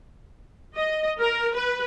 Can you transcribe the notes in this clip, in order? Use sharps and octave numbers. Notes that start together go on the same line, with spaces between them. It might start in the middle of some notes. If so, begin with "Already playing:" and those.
D#5
A#4
B4